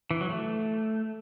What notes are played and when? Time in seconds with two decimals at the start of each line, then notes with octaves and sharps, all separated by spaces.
0.11 E3
0.21 F#3
0.30 A3